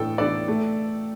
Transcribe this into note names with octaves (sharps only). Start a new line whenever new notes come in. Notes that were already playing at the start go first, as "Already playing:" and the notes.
Already playing: A2 E3 B3 D4 A4 G5
E3 B3 D4 A4 B4 D5
A3